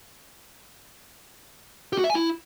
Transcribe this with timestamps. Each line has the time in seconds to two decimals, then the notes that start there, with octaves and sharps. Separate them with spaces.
1.93 G4
1.98 F#4
2.04 E5
2.10 G#5
2.15 E4